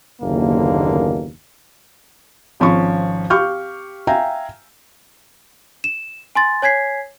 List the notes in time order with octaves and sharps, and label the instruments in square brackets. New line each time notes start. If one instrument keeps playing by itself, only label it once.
[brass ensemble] F#1 D#2 B2 D3 A#3
[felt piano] G#1 F3 C#4 C#6
G4 F5 C#6 F6 G6
E5 F5 G5 G#5 A#5
[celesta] E7
G#5 C6 A6
C#5 G#5 G#6 B6 C7